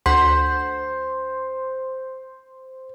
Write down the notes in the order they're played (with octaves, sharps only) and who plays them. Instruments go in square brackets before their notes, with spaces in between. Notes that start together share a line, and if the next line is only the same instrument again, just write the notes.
[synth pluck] D2 F#5 B6 [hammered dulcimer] C5 [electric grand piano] C6